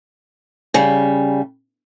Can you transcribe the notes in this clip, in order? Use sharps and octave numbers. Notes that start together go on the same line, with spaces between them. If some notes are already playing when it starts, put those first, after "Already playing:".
C#3 G3